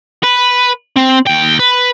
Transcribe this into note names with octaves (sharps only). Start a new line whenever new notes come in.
B4
C4
D#2 G5
B4